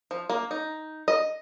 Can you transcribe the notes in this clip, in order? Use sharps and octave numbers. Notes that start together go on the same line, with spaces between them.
F3
A#3
D#4
D#5